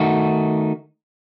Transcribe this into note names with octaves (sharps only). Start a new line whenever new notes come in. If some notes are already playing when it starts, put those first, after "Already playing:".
Already playing: D#3 A3 D#4 F#4